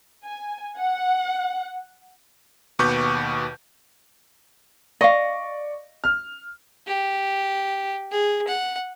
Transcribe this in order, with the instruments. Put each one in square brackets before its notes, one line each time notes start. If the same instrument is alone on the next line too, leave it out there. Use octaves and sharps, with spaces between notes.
[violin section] G#5
F#5
[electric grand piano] D#2 B2 B4 C#6 D6 G6
[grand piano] D5 C#6 [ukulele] D#5 F5
[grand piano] F6
[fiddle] G4
G#4
F#5